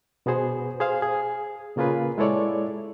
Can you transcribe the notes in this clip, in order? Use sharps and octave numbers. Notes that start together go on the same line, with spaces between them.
B2 B3 F#4 G#4 C5
G#4 C5 F5
G#4
A#2 C#3 A#3 F4 G#4 B4
G#3 E4 A4 C#5 D5